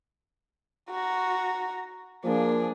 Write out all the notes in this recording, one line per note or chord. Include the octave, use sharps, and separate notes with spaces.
F#4 A#5
F3 A#3 D4 G#4